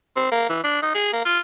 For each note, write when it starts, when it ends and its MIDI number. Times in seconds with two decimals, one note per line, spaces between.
0.16 0.31 60
0.32 0.45 58
0.49 0.59 52
0.64 0.81 62
0.82 0.93 63
0.95 1.12 68
1.13 1.23 58
1.26 1.39 65